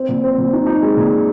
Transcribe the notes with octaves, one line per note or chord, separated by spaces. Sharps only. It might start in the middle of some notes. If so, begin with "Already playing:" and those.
Already playing: C4
A#2
C4
A#2
D#4
D#4
G#3
A#2